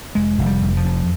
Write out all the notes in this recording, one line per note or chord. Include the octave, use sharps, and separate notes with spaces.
F1 G#3
F1
G3
F1
F3
F2